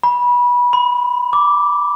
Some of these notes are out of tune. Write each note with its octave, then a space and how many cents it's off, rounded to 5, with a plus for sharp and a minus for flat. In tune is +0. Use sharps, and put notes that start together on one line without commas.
B5 -25
B5 +35
D6 -5